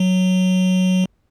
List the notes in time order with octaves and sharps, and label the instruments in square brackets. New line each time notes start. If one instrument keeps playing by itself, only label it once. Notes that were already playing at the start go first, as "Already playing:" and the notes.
Already playing: [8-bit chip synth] F#3